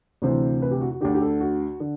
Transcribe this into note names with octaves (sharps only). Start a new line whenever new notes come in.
D2 C3 E3 C5
B4
G4
F#4
F#4
D2 D3 G4
G4
A4
F#4
D3